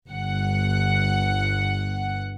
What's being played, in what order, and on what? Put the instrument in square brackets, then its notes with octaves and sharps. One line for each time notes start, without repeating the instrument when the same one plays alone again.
[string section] G1 F#5